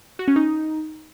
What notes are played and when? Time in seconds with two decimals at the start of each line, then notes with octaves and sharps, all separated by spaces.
0.19 F#4
0.28 C#4
0.36 D#4